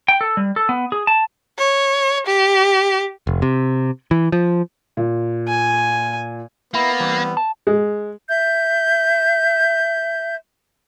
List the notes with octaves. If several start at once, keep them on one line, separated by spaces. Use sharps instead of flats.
G5
A4
G3
A4
B3
G#4
A5
C#5
G4
F1
C3
E3
F3
A#2
G#5
A#3 B3 E4
E3 G3 C4
A5
G#3
E5 G6